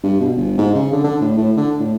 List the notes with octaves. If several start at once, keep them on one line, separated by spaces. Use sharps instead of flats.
G2
B2
G1
G#2
C#3
D3
D3
A2
A2
D3
A2